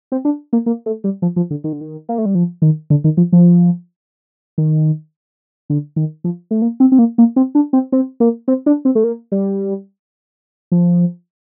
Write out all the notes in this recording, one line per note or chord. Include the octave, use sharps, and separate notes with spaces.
C4
D4
A#3
A#3
A3
G3
F3
F3
D3
D#3
D3
D#3
A#3
A3
G3
F3
D#3
D3
D#3
F3
F3
D#3
D3
D#3
F3
A3
A#3
C4
C4
A#3
A#3
C4
D4
C4
C4
A#3
C4
D4
C4
A3
A#3
G3
F3